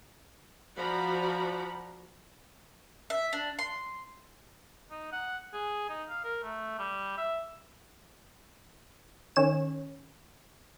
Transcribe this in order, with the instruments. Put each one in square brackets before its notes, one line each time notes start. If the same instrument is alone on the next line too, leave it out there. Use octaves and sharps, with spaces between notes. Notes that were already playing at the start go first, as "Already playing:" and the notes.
[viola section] F3 F#4 D5 A#5 B5
[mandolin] E5
D4
C6
[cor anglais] D#4
F#5
G#4
D#4
F5
A#4
A3
G3
E5
[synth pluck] D#3 C#4 C#5 E7